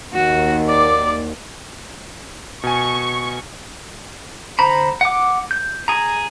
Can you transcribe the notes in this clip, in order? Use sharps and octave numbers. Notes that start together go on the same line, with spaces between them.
D#2 F#4
D5 D6
B2 G#5 C#6
D3 C5 A#5 B5
F#5 D6
G6
G#4 A#5